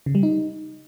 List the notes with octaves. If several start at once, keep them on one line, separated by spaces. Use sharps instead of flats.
C#3
G3
D#4